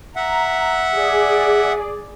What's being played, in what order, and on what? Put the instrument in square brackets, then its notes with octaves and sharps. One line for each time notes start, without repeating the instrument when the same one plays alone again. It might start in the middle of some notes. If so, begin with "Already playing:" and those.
[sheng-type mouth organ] E5 F#5 [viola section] A#5
[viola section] G#4 D5